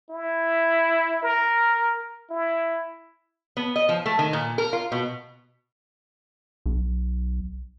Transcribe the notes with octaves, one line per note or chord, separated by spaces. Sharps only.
E4
A#4
E4
B3
D#5
F3
A3
D#3
A#2
A#4
F4
B2
B1